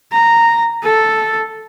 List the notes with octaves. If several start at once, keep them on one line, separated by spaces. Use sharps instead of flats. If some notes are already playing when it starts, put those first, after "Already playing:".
A#5
A4